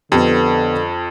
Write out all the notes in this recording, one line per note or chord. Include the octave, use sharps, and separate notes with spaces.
F2 D3 B3 G4